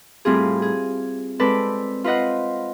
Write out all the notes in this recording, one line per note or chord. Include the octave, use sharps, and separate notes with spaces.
A2 G3 C4 F4 G#4
G#4
G#3 C4 A4 B4 D5
F4 B4 C5 D#5 F#5